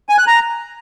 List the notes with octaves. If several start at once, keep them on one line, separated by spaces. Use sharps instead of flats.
G#5
F#6
A#5